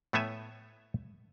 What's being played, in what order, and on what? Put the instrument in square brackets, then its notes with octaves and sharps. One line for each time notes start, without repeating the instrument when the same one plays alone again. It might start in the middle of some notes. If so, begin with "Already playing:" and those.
[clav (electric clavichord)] A2 A3 B3 C#5 E5 G#5